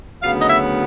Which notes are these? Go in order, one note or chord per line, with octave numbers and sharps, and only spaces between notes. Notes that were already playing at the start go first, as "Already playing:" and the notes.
D2 C#3 F#3 B3 F5
D#5
E5